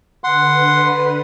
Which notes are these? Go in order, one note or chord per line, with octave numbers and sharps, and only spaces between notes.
D3 B4 F#5 C6